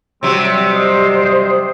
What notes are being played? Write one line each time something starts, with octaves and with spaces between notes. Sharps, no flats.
C3 F#3 G3 C4
C5 D#5